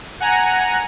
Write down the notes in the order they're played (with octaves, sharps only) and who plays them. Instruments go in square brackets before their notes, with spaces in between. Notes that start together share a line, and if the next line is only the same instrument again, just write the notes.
[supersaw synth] F#5 G#5 A#5